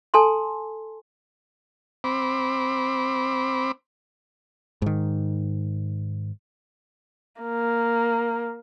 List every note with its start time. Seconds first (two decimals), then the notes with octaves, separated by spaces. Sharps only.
0.14 A4 G#5 A5 C6
2.04 C4 B5 D6
4.82 G#2 D#3
7.41 A#3